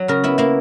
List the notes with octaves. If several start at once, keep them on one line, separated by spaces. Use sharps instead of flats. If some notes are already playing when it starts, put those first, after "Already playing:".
Already playing: F#3
C#3 A#4
B3 E4
A#3 E4